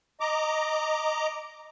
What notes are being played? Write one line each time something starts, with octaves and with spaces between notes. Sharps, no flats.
D#5 A#5 D6